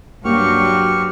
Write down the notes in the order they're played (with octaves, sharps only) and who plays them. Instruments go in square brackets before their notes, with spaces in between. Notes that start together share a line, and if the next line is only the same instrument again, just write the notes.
[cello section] G2 F#3 F#4 [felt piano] A#3 [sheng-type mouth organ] G4 C#6 F6